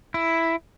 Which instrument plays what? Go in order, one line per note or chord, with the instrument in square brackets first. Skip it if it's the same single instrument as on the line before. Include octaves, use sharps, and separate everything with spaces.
[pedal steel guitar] E4